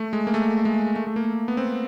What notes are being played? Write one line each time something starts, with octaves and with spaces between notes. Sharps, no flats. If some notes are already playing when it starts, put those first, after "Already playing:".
Already playing: A3
G#3
A#3
A3
G#3
A3
A3
A#3
B3
C4